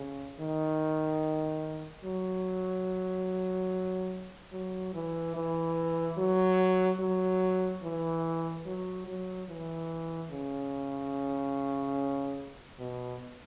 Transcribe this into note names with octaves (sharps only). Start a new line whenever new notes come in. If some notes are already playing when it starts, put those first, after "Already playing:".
Already playing: C#3
D#3
F#3
F#3
E3
E3
F#3
F#3
E3
F#3
F#3
E3
C#3
B2